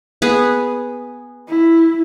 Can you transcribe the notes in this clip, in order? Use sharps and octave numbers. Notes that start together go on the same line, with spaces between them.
B3 G#4
E4